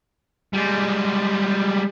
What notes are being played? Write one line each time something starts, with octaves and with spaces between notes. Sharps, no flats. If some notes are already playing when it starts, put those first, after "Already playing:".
G3 G#3